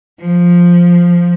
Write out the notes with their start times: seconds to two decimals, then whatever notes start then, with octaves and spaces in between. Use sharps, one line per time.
0.21 F3